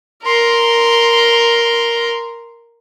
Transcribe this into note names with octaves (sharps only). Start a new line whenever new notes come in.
A#4 C6